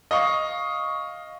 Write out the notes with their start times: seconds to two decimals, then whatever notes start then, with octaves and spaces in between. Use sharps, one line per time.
0.11 D#5 F5 C#6